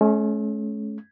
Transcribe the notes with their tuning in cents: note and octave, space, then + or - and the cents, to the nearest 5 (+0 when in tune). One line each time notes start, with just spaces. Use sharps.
A3 -45 C#4 +0